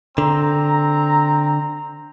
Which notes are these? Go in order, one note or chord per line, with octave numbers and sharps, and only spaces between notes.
D3 C4 A#5